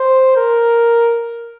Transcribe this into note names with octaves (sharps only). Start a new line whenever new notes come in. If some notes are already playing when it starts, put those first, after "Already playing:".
Already playing: C5
A#4